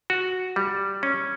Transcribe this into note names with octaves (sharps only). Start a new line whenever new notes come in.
F#4
G3
C#4